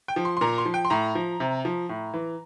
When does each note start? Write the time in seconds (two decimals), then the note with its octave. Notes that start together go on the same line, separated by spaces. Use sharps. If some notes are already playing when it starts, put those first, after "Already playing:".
0.08 G5
0.16 F3
0.25 C6
0.37 C6
0.41 A#2 A#5
0.58 C6
0.65 F3
0.74 G5
0.85 C6
0.90 A2 A#5
1.15 F3
1.40 C3
1.65 F3
1.89 A2
2.14 E3